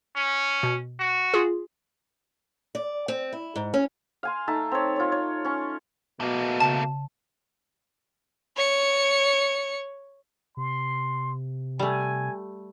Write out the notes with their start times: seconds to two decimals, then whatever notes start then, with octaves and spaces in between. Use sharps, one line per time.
0.16 C#4
0.63 B2
1.00 F#4
1.34 F4 G#4
2.75 D5
3.08 C4
3.33 E4
3.56 G#2
3.74 C#4
4.23 F5 G#5 C6
4.47 A3 D#4 E5 A5
4.71 C4 C#5
4.96 F4 C#5
5.12 C#5
5.45 C#4 C#6
6.21 B2 A3 A#3
6.60 C#3 A5
8.57 C#5 C#7
10.57 C3 C6
11.79 G3 A3 G#5